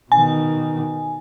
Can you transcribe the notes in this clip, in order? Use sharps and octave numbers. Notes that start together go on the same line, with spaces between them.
B2 D#3 G#5